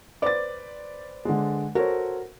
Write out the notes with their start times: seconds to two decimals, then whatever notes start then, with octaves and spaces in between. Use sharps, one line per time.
0.22 B4 C5 D5 D6 A6
1.25 D3 G#3
1.75 F#4 A4 A#4 C5 C#5